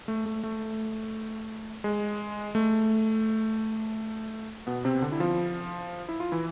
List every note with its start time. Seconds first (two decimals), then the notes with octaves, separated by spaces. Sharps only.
0.08 A3
0.26 A3
0.44 A3
1.84 G#3
2.55 A3
4.67 B2 B3
4.85 C3 C4
5.02 D3 D4
5.12 E4
5.20 F3 F4
6.09 E4
6.20 F4
6.32 E3 E4